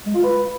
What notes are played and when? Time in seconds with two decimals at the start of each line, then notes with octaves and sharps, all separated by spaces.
0.06 G#3
0.14 F4
0.23 B4